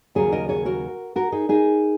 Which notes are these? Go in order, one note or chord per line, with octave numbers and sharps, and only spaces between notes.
D#2 C#3 F#3 G#4 C#5
A#4 D#5
G#4 C#5
F#4 A#4
F#4 A#4
D#4 G#4
D#4 G#4